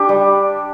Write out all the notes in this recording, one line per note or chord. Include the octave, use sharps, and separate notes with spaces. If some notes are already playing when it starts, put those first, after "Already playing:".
Already playing: D4 G4
G3